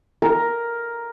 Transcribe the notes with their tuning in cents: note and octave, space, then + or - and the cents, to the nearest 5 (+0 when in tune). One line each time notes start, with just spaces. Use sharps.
A#4 +5